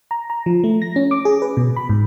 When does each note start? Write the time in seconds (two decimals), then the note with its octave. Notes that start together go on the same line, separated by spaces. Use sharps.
0.11 A#5
0.30 A#5
0.46 F3
0.64 A3
0.82 A#6
0.96 C#4
1.11 D6
1.25 G#4
1.42 B4
1.57 B2
1.76 B5
1.89 G#2